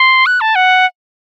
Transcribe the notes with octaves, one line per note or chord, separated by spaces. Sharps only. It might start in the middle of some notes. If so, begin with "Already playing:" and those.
Already playing: C6
F#6
A5
F#5